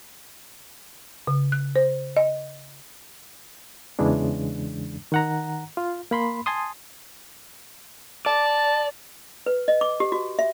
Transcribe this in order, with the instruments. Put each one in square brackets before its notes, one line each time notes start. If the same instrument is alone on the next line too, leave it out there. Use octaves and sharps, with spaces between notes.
[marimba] C#3
F#6
C5
D#5
[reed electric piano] E2 C#3 E3 G#3 D4
D#3 F#5 A#5
F4
A#3 B5 C6
G#5 A5 C6 D#6
[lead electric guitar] D5 [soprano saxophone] A5
[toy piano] B4
D#5
D6
G4
F#4
E5